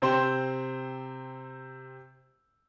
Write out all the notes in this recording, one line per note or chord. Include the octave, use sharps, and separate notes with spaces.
C3 C4 C5 C6